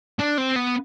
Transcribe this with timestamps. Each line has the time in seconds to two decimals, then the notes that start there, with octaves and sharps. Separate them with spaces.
0.19 D4
0.38 C4
0.56 B3